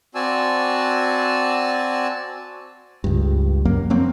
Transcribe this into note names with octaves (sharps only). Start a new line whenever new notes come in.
C4 F#4 D5 G#5 A5 E6
C#2 G2
F#2 F#3 A#3
F3 F#3 A#3 C4